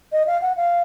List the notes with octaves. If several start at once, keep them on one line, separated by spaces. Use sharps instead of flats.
D#5
F5
F#5
F5